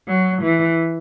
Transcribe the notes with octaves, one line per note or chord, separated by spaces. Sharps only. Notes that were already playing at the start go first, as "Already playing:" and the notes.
F#3
E3